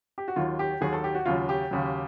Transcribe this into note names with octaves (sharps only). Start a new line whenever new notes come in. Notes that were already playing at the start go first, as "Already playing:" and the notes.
G4
F#4
D#2 D#3 F#3 F4
G4
D#2 D#3 F#3 G#4
A4
G4
F#4
D#2 C#3 F#3 F4
G4
D#2 C#3 F#3